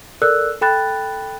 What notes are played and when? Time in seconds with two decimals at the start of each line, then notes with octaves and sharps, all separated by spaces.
0.22 A4 A#4 D5 E6 F#6
0.61 A4 G5 B5 F#6 A6